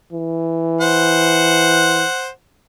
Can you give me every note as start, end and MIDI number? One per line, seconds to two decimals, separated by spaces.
0.12 2.04 52
0.81 2.29 72
0.81 2.29 78